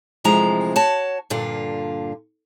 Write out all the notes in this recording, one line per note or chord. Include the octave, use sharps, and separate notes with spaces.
D2 C3 E3 F3 G#3 A#5
F#4 C#5 A5
G2 A#2 D3 F4